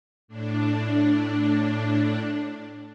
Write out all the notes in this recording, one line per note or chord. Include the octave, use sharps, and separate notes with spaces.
A2 D4